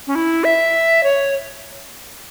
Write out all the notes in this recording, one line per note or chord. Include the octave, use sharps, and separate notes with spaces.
C#4
E4
E5
C#5